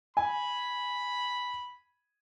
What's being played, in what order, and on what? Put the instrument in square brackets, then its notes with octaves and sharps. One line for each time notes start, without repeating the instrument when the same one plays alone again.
[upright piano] G#5 [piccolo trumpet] B5